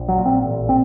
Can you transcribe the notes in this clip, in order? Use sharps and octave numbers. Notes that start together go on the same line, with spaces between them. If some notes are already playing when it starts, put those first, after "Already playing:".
Already playing: A#1
F#3
A#2
C4
A1
C4